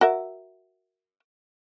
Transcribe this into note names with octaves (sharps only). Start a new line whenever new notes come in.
F#4 A#4 E5